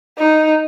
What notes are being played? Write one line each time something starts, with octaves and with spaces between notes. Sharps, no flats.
D#4